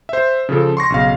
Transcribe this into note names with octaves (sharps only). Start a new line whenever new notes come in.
C5 E5
C#3 F3 A4
C6 C#6 A#6
B1 C#3 F5